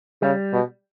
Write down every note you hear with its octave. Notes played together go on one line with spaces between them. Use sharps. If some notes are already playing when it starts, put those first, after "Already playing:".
C#3 G3
B2